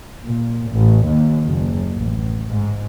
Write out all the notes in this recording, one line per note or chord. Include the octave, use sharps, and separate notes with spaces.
A#2
A1
D#2
F#1
A1
G#2